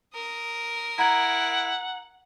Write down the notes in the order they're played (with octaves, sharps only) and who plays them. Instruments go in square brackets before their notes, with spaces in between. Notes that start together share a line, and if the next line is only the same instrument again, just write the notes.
[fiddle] A#4 D#6
[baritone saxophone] E4 [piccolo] F#5 [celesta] A#5 G#6